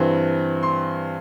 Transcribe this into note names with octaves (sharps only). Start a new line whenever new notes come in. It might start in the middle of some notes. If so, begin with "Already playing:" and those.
Already playing: G2 E3 C4 C6
C6